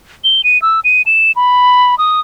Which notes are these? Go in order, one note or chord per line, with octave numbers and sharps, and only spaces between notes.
G7
D#7
E6
D#7
E7
B5
D#6